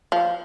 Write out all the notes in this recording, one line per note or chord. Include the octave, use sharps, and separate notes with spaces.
F3